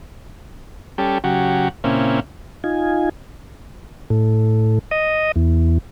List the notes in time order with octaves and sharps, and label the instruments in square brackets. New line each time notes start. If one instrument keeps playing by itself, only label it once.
[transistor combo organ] G3 C#4 G4 A4
C#3 F#3 F#4 G4
A#2 C#3 A#3 C4 C#4 E4
[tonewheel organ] D#4 F4 G#5
A2
D#5
E2